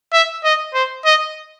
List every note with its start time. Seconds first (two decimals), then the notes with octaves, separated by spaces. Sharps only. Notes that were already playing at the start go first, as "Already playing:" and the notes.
0.13 E5
0.44 D#5
0.74 C5
1.05 D#5